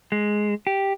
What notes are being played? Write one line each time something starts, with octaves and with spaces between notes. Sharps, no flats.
G#3
G4